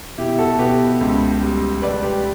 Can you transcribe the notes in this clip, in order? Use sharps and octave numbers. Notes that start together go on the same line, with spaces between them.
B2 E4 G4
F#4 A4
B2 G4 B4
C#2
G3
C#2 B4 D5
G4 B4